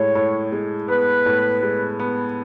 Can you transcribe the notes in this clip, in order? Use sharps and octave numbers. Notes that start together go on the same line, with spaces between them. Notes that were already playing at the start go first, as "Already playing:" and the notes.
Already playing: A2 G#3 C#5
A2
G#3
B3 B4
A2
G#3
B3